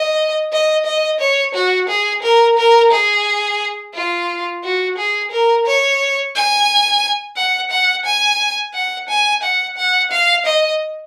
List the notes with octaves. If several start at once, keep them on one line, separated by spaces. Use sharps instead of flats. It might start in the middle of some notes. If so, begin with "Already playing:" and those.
Already playing: D#5
D#5
D#5
C#5
F#4
G#4
A#4
A#4
G#4
F4
F#4
G#4
A#4
C#5
G#5
F#5
F#5
G#5
F#5
G#5
F#5
F#5
F5
D#5